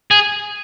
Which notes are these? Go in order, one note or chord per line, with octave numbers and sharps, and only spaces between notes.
G#4